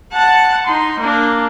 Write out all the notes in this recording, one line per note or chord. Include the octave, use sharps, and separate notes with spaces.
F#5 A5
D#4 C6
A#3 D4